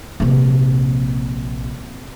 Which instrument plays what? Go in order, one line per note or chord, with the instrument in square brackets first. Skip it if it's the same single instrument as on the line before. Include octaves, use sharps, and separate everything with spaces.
[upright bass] A#1 C3